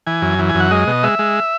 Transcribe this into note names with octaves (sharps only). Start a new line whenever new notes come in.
E3 G#5
F#2
E3
G#5
F#2
F#5
G#3 D#5
B2
G#3 E5
G#3